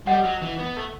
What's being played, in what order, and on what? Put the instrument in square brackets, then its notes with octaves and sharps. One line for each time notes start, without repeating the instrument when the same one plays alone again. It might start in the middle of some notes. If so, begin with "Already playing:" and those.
[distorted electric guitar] G3 [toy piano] A4 D#5 F#5
[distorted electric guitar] F#3
E3
B3
A3